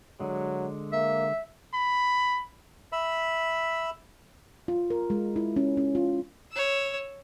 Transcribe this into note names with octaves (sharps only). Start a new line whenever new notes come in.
D3 F#3 G#3
A#3 E5
B5
E5 B5
F4
A#4
G#3
E4
C#4
C#4
F4
C#5 E6